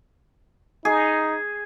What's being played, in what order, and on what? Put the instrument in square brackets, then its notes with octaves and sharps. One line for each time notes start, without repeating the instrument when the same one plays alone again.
[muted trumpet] D#4 [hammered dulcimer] G#4